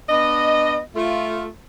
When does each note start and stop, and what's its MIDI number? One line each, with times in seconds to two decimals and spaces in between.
0.09 0.79 59
0.09 0.79 62
0.09 0.79 75
0.96 1.46 57
0.96 1.46 65